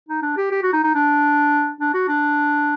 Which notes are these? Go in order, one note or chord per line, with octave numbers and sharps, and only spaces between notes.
D#4
D4
G4
G4
F#4
D#4
D#4
D4
D4
F#4
D4